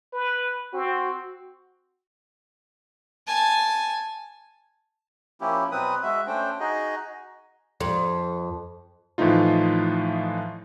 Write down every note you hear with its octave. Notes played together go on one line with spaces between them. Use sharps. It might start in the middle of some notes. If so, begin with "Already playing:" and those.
B4
C4 F#4
G#5 A5
F3 A#3 C#4 E4 G4
B2 F#3 C4 B4 D#6
G#3 F#4 E5
A3 C#4 D4 C5 G5
D#4 F#4 G#4 D#5
F2
A2 E3 F3 A3 D#4 F4